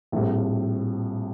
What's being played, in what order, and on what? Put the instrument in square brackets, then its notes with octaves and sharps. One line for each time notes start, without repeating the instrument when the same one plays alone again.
[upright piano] A#1 A2 G3 C4